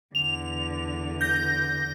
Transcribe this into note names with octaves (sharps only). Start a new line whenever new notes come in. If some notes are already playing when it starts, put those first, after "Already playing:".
E2 D3 F7
G6 A#6